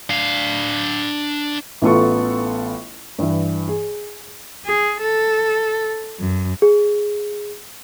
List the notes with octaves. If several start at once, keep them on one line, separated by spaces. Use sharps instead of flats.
D4 F5
A1 E3 B3 F4 A4 C#6
G2 E3
G#4
G#4
A4
F#2
G#4